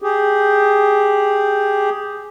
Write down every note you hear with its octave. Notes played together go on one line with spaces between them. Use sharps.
G4 G#4